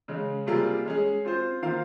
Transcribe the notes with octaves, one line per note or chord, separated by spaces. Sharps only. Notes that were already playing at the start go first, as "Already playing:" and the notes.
C#3 G#3 C#4
C3 G3 A#3 F4 G#4
G#3 C#4 G#4
C4 F4 C5
D#3 A#3 F4 C5 F5